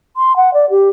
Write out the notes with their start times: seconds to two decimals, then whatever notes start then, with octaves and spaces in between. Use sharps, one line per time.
0.17 C6
0.36 F#5
0.54 D5
0.70 G4